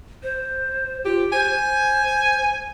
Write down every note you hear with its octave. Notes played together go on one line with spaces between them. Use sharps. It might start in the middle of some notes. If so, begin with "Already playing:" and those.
C5
F4 G4
C5 G#5